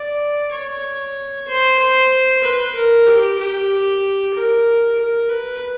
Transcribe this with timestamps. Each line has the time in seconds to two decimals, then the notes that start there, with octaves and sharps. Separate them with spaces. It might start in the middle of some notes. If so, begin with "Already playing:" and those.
Already playing: D5
0.53 C#5
1.48 C5
1.79 C5
2.43 B4
2.75 A#4
3.07 G4
3.39 G4
4.34 A#4
4.98 A#4
5.30 B4